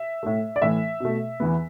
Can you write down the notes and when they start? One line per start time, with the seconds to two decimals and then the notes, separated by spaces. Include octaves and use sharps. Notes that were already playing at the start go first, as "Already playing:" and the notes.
Already playing: E5
0.23 A2 A3
0.56 D5
0.61 A2 E3 A3 E5
1.00 B2 A3
1.40 E2 E3 B3